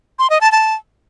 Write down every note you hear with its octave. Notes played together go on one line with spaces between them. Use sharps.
C6
D#5
A5
A5